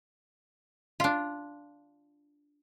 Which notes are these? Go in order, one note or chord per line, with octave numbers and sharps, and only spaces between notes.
D4 F4